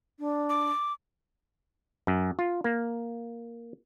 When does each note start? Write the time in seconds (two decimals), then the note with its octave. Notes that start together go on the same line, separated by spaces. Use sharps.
0.19 D4
0.49 D6
2.07 F#2
2.39 F4
2.64 A#3